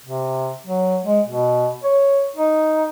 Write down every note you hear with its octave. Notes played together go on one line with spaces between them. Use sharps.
C3
F#3
G#3
B2
C#5
D#4